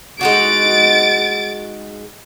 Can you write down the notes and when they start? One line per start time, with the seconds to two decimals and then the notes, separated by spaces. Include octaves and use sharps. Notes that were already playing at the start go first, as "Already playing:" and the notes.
0.21 G#3 D#4 F#4 A6 D7